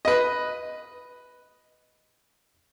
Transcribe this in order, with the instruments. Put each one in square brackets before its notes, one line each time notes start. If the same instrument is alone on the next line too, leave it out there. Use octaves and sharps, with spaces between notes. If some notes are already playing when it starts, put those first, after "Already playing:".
[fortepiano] B4 D#5